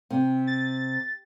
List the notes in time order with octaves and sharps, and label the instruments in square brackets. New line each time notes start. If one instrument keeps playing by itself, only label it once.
[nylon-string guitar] C3
[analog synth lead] A6